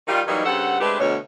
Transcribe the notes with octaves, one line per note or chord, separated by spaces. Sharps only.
D#3 G3 F4
E3 F#3 G3 A#3 D#4
G2 C#3 C4 A4 F#5
G#3 A3 C4 D4 G4 B4
D2 B2 C#5